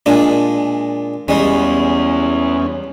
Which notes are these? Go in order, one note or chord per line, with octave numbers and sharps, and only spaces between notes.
A#2 G#3 D4
E2 G3 G#3 C#4